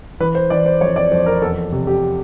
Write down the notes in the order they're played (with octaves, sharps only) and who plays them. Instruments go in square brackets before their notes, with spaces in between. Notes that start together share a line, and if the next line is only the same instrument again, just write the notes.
[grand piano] E3 B4
C5
E3 D5
C5
F2 C#5
D5
F2 C5
A#4
E2 A4
C3
G4